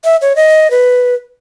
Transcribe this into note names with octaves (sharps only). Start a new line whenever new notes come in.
E5
C#5
D#5
B4